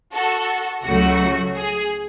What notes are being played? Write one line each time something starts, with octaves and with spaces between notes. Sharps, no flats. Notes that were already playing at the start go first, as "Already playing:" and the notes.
F#4 A4
C#2 C#3 F#3 A3 F#4
G#4